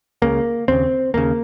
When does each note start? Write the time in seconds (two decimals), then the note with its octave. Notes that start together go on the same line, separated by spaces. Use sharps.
0.22 C#2 C#3 A#3
0.68 D#2 C#3 C4
1.14 D#2 C#3 A#3